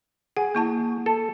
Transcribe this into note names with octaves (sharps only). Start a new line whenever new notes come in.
G#4 F#5
A#3 E4 A5
A4